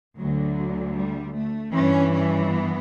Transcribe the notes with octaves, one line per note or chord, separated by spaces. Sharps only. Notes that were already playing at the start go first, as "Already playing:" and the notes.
D2 D3 F#3
G3
A3
G2 E3 C#4
C#4
B3